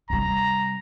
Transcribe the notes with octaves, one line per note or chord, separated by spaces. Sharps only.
C3 G3 A#5